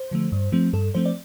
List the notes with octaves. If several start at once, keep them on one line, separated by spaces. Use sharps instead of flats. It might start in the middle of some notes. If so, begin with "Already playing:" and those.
Already playing: C5
D3 F3 A3
G2
F3 A3 C4
G2 A4
F3 A3 C4 C5
D5